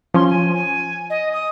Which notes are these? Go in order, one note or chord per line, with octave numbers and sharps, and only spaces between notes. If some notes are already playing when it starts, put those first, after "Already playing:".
F3 C#4 C6
G#5
G#5
D#5
D#6